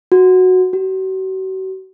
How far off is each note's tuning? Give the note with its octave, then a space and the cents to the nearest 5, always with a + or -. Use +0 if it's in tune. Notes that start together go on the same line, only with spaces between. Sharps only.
F#4 -5
F#4 +40